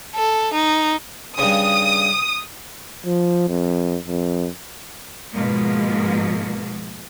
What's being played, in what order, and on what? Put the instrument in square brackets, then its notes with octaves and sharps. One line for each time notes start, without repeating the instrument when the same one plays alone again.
[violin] A4
D#4
[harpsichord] G2 C#3 [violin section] D#6
[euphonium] F3
F2
F2
[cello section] G#2 B2 F3 G#3 A#3